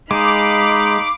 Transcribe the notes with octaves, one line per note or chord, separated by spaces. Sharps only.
G#3 D#4 F5 B5 D6